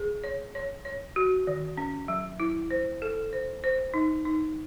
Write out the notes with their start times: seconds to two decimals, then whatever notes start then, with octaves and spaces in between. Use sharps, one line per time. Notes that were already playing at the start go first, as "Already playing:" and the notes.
Already playing: G#4
0.24 C#5
0.55 C#5
0.85 C#5
1.16 F#4
1.47 D#3
1.77 C#4
2.08 F#3
2.40 E4
2.71 C5
3.02 A4
3.33 C5
3.64 C5
3.94 D#4
4.25 D#4